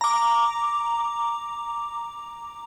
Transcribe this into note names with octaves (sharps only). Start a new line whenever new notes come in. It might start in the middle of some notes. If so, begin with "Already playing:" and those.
A#5 D6